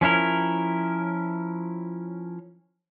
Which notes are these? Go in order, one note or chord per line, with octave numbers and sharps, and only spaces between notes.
F3 C#4 E4 A#4